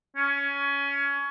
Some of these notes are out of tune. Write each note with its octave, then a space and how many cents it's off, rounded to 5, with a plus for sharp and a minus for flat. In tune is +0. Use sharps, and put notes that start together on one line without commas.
C#4 +20